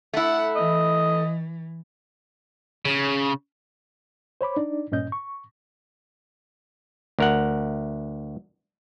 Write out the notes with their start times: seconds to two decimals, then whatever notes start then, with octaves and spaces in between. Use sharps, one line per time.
0.13 A3 E4 F#5
0.56 E3 D#5
2.85 C#3
4.41 C5 C#5 B5 D6
4.56 D4 D#4 D5
4.92 G2 A#2 C#4 D#5 G6
5.12 C#6
7.19 D2 A#4 F#5